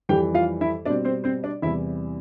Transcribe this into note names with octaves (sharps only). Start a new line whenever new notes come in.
F2 E3 G3 G4 G5
F4 F5
E4 E5
B2 G3 C4 D4 D5
C4 C5
C4 C5
D4 D5
E2 C3 E3 G3 E4 E5